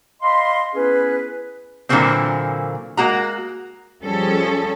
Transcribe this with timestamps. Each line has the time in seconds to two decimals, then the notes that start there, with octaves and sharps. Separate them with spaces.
0.22 D#5 F5 B5 C6
0.74 B3 C#4 E4 G#4 B4
1.89 A#2 D3 E3 F#3 A#3 C4
2.97 G#3 A#3 F#4 A#5
4.04 F3 G3 C#4 G#4 A4